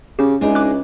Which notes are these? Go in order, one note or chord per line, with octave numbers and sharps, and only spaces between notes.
C#3 C#4 G4
C#2 G#3 D4 D#4
D6 F#6